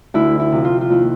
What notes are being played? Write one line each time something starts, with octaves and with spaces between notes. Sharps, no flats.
D2 E4
E4
C3 F3
F4
F4
D#2 E4